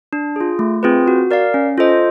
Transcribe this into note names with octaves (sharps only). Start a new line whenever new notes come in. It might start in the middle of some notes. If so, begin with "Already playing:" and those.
D4
F4 G#4
A3
C4 F4 G#4 B4
F#4
A#4 D5 F5
C#4
F4 A4 C5 D#5